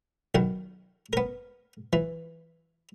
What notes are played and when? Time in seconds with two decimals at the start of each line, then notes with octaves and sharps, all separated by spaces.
0.35 B1 D#3 F#5
1.13 B3 A#4
1.93 E3